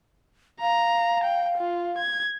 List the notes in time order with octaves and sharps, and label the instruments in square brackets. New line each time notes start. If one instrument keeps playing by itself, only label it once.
[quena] F5 [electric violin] A#5
[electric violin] G5
F4
G#6